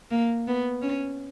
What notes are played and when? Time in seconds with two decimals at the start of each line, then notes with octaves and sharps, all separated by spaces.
0.11 A#3
0.47 B3
0.82 C#4